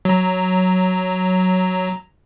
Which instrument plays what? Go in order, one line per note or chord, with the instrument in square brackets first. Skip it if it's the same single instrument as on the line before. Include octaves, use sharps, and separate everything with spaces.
[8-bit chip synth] F#3 A#5